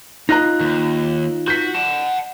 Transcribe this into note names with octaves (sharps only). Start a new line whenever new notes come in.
D#4 F4 D#5 A#5 F#6 A#6
D#2
F#4 G6 B6
F#5 A5